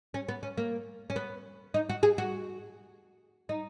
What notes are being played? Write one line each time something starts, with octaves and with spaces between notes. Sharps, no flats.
C#4
B3
C#4
A#3
C#4
B3
D#4
F#4
G#4
F#4
D#4